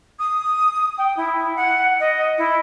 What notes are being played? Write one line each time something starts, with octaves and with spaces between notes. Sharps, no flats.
D#6
G5
E4
F#5
D#5
E4